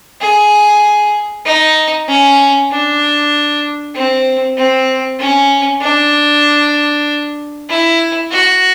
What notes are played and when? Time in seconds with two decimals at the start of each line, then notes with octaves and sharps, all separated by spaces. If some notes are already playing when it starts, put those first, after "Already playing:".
0.21 G#4
1.45 D#4
2.08 C#4
2.71 D4
3.94 C4
4.57 C4
5.19 C#4
5.81 D4
7.69 E4
8.31 F#4